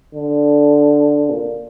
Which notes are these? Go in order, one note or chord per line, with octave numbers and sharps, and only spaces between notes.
D3
A#2